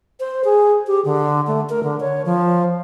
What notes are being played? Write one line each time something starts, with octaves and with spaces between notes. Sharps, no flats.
C5
G#4
G4
D3
A3
A#4
D3
C#5
F3